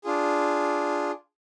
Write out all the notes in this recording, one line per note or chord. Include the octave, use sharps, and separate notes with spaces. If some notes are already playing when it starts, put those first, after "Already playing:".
D4 F4 G#4